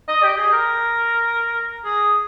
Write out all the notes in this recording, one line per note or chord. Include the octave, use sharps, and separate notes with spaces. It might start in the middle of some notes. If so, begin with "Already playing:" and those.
D#5
G4
G#4
A#4
G#4